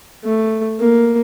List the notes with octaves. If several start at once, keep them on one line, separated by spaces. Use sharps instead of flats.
A3
A#3